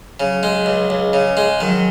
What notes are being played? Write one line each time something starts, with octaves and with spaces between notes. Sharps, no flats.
C#3 F#3
G#3
C#2
C#2
C#3
G#3
D#3 F#3